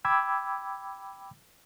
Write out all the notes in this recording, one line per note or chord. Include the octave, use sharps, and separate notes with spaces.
G5 B5 D6 E6 G#6